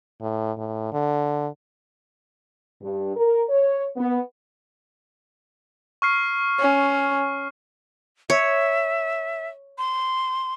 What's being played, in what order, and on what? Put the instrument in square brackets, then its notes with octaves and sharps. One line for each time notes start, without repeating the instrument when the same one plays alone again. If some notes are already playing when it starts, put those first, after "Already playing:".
[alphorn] A2
A2
D3
[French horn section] G2
A#4
C#5
B3
[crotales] C#6 F6 C7
[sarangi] C#4
[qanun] C#5 [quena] E5
[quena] C6